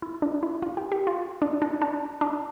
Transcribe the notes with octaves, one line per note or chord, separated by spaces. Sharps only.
E4
D4
E4
F4
G4
G4
F4
D4
D4
D4
D4